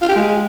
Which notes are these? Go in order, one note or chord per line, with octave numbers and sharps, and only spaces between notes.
F4
G4
G#3